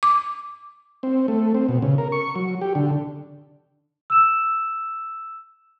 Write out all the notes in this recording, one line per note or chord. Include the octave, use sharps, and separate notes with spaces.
D6
C4
A3
C4
B2
C#3
A#4
C#6
F#3
G4
D3
E6 E7